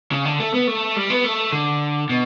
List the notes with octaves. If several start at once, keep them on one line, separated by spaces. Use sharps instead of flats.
C#3
D3
A3
B3
A3
G3
B3
A3
D3
B2